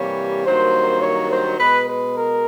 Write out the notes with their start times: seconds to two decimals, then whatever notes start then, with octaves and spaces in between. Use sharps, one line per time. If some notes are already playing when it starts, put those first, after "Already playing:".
Already playing: C3 E3 G3 A#3 C#5
0.44 G2 D#3 F#3 A#3 C5
1.00 C#5
1.29 C5
1.58 B2 G#3 B4
1.86 B4
2.14 A#4